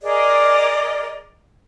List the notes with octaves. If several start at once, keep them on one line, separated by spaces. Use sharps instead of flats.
G#4 A#4 D5 D#5